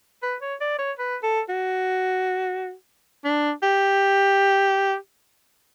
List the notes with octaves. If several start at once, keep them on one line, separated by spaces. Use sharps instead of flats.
B4
C#5
D5
C#5
B4
A4
F#4
D4
G4